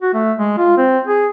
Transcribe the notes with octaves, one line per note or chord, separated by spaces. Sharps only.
F#4
A3
G#3
F4
C4
G#4